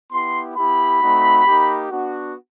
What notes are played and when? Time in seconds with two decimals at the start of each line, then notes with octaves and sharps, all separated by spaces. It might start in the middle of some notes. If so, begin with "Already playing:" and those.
0.12 B3 E4 G4 C6
0.56 B3 E4 G4 B5
1.01 A3 C4 D#4 F#4
1.46 A#3 D#4 G4
1.91 B3 D4 F#4